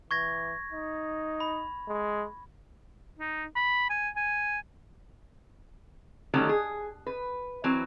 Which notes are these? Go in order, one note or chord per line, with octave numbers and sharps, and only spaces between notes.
E3 C#6 G#6 A#6
D#4
B5
G#3
D#4
B5
G#5
G#5
D3 D#3 F#3 G3 A3 C#4
G#4
B4
E3 F#3 C4